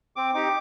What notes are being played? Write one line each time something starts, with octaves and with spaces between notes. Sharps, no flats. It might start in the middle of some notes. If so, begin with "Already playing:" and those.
C4 D6
D#4 G4 D6